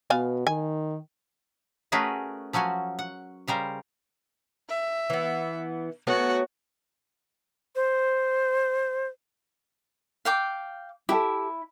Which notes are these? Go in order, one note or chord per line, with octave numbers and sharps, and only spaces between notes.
B2 B3 F5 G#5
D#3 G#5
A3 C#4 F#4 G#4 A#4 B4
F3 F#3 C#4 F#4 G#5
F#5
C#3 G3 A#4 C5
E5
E3 B3
F#3 A3 B3 F#4
C5
F5 G5 D6
E4 G4 A4